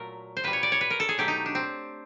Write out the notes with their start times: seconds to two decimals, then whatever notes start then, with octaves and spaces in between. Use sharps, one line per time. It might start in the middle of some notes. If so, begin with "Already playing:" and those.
Already playing: A#2 F#3 A3 A#4
0.37 C5
0.44 A#2 G3 B4
0.53 C#5
0.63 D5
0.72 C#5
0.81 B4
0.90 A#4
1.00 A4
1.09 G#4
1.18 B2 F#3 A3 G4
1.28 D#4
1.46 D4
1.55 C4